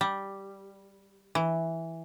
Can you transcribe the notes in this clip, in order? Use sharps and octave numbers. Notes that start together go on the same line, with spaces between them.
G3
E3